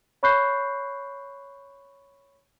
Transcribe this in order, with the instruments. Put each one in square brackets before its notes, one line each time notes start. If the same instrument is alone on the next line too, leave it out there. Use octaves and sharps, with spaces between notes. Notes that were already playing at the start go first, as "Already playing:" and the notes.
[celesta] C#5 B5 C#6 F#6 G6 C7